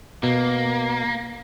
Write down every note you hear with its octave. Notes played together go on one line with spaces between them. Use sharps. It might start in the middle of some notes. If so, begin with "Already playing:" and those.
B2 A#3